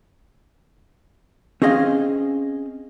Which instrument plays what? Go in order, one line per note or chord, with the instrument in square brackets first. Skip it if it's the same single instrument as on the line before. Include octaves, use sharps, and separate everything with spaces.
[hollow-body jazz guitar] C4 C#4 G#4 D#5 F5 G#5